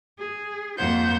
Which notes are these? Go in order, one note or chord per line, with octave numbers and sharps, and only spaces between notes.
G#4
F2 A#3 F4 C5 F#5 G6